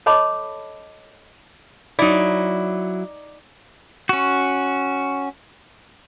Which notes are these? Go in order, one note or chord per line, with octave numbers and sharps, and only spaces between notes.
A4 C#5 D#5 A5 B5 D6
F#3 D#4 E4 D5
C#4 F#4